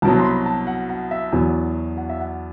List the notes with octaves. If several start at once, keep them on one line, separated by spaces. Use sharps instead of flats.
C2 B2 F#3 A5
C6
B5
A5
F#5
F#5
E5
E2 B2 F#3
F#5
E5
F#5